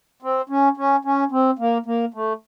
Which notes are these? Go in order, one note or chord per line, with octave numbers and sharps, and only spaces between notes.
C4
C#4
C#4
C#4
C4
A#3
A#3
A3